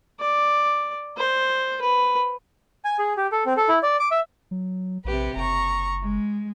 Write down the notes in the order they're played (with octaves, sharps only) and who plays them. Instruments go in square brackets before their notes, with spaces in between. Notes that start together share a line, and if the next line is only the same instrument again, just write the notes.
[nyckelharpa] D5
C5
B4
[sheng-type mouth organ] G#5
G#4
G4
A4
C4
A4
E4
D5
D6
E5
[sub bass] F#3
[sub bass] A#1 [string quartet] C3 G4 B4
[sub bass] F#1 [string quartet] A#5 C#6
[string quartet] G#3